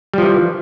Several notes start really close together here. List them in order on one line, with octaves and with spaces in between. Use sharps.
G3 F3 E3